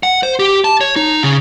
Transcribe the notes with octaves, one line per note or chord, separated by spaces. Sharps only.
F#5
C5
G4
A5
C#5
D#4
C#3